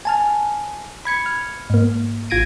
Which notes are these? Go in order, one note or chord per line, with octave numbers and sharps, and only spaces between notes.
G#5 A5 F6
B5 G#6 C#7
F6
G#2 A#3
A1 F4 G#6 A#6 D7 D#7